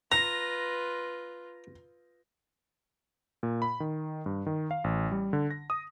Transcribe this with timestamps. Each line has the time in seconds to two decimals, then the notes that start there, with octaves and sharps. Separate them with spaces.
0.12 F4 B4 A#5 A#6
3.43 A#2
3.62 B5
3.80 D#3
4.26 G2
4.46 D#3
4.71 F5
4.84 A1
5.11 G3
5.33 D3
5.51 A#6
5.70 D#6